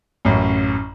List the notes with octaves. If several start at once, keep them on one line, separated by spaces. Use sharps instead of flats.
A1 F#2